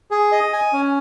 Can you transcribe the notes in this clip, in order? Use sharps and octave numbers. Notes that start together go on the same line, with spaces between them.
G#4
D#5
G#5
C#4